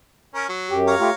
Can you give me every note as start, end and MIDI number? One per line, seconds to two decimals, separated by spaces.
0.35 0.45 61
0.35 0.45 70
0.49 0.80 54
0.70 0.95 42
0.70 0.95 67
0.87 1.15 73
0.87 1.15 77
0.87 1.15 82
0.99 1.10 57
0.99 1.10 65
0.99 1.10 67